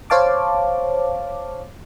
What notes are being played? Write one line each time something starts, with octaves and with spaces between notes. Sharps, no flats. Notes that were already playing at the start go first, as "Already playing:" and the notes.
C5 C#5 F5 A5 D6